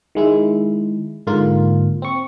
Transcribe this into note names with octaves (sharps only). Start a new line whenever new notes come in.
D#3 G#3 E4
G#2 D3 A#3 F4
C4 C#6